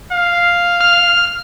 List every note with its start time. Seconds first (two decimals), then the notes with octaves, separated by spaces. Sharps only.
0.12 F5
0.81 F6